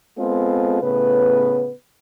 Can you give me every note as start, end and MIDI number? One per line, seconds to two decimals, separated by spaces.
0.19 0.79 56
0.19 0.79 59
0.19 0.79 60
0.19 0.79 65
0.19 0.79 68
0.19 0.79 69
0.82 1.72 45
0.82 1.72 49
0.82 1.72 59
0.82 1.72 71